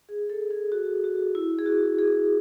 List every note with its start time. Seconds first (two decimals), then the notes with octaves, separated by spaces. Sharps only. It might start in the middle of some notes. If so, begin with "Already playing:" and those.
0.09 G#4
0.30 A4
0.51 G#4
0.72 F#4
1.04 F#4
1.35 E4
1.59 G#4
1.66 F#4
1.99 G#4